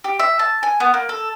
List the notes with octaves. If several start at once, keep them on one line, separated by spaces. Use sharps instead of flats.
G4
E5
A5
G#5
B3
A#3
A4